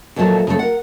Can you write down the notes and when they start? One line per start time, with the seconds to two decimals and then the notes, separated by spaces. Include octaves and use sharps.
0.16 D#2 A#2 F3 F#3 A3 A5
0.47 C#3 F3 F#3 A3 A4
0.59 A#4 F#5